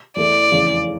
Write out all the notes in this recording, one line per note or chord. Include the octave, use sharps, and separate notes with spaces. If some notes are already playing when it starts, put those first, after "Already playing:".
E2 E3 A3 D5
F1 E2 C#3 E3